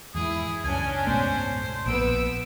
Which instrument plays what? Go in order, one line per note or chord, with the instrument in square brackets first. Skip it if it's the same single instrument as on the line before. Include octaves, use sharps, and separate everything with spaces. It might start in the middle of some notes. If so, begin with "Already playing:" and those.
[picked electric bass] E2 G#2 [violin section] E4 [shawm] G#4
[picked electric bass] C#2 F#2 [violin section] C#4 D4 [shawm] G#5
[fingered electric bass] G#2 B2 A3 [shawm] C5
[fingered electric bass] A#1 A#2 [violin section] B3 E6 D7